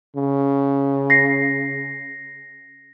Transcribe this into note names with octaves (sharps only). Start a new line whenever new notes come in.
C#3
A#6 C7